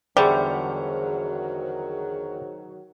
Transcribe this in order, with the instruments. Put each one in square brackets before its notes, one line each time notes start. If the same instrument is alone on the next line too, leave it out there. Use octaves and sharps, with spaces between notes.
[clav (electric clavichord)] E2 D3 [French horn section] D#3 F#3 F#4 [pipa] G3 [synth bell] G#4 C5